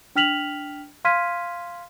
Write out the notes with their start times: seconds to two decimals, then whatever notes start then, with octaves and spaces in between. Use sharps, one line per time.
0.15 D4 G5 F6 B6 F7 F#7
1.05 F5 C6 F6 G#6 B6 D#7